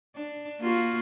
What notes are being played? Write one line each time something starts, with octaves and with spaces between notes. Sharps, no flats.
D4
A#3 F4 F#4